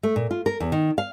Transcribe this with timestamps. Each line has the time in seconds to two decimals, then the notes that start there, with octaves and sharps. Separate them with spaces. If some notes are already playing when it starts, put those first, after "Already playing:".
0.03 A3
0.16 A#2
0.31 F4
0.46 A#4
0.60 E2
0.72 D#3
0.98 F5